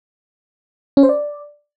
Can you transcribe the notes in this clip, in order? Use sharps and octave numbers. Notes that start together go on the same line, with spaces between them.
C#4
C5
D5